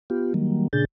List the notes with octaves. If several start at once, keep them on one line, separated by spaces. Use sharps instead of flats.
B3 F4 G4
D#3 F#3 G3 A#3
A#2 C#3 D4 G#4 G6 A6